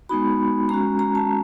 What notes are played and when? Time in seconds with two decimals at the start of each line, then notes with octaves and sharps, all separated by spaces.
0.09 G#3 B3 D#4 F#4 B5
0.69 G#3 C#4 F#4 A#5
0.99 A#5
1.15 A5